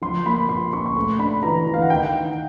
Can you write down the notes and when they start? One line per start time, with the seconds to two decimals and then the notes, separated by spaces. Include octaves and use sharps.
0.02 F3 C6
0.26 A#3 B5
0.49 A#2 C6
0.73 C#4 C#6
0.86 C#6
0.96 A3 C6
1.19 D4 B5
1.43 E3 A#5
1.67 E3
1.74 F5
1.82 F#5
1.90 D#3 G5